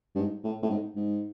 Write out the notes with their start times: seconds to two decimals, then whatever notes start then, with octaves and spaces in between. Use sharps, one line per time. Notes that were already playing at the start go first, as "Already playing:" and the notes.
0.15 G2
0.18 G#2
0.44 A2
0.63 A2
0.70 G#2
0.96 G#2